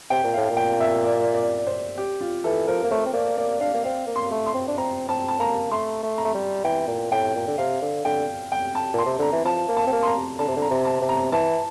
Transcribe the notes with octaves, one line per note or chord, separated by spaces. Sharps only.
C3 G5
A#2
A2 F5
A#2
G5
E5
D5
D5
C5
G4
F4
E3 A4
F3 A#4
A#3
A3 C5
C4
A#3 D5
A#3 D5
D4 F5
A#3
C4 F5
A#3
C6
A3
C6
C4
D4
C4 A#5
C4 A5
A5
A#3 A#5
A3 C6
A3
A#5
A3
G3
E3 G5
A#2
A2 G5
A#2
D3
C3 F5
D3
D3 G5
G5
A5
A#2 C6
C3
D3 A#5
E3
F3 A5
A#3
A5
C4
A#3
C6
A#5
D3 A5
C3
D3
A#5
C3
A5
C3
A#5
E3 A5